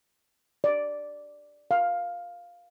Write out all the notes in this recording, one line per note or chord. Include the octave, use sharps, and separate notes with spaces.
D5
F5